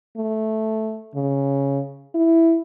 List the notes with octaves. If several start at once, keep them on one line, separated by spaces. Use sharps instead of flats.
A3
C#3
E4